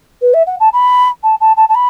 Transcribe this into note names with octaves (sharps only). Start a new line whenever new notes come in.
B4
E5
F#5
A5
B5
A5
A5
A5
A5
B5